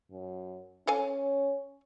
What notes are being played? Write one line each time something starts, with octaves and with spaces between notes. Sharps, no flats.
F#2
C#4 A4 F5 G#5